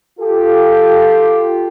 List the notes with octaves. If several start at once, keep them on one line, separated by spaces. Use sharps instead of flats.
F4 G4 A4